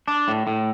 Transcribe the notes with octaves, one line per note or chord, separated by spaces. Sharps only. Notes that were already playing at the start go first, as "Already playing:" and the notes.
D4
A2
A2